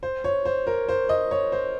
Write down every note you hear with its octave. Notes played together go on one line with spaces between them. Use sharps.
C5
C#5
C5
A#4
C5
D#5
C#5
C5